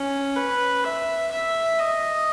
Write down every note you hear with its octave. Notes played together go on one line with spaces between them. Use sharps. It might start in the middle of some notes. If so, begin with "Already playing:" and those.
Already playing: C#4
B4
E5
E5
D#5